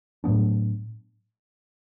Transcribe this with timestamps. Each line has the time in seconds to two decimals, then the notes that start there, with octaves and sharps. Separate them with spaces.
0.24 A2 F#3 B3 D4